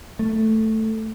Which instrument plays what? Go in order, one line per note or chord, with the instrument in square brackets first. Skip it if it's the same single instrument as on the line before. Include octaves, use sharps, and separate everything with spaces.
[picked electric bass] A3